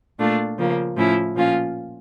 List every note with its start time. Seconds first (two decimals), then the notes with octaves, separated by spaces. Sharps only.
0.19 A#2 A3 D4 F4
0.58 C#3 F3 A#3
0.96 A2 F3 C#4 E4
1.35 A#2 F3 C#4 F4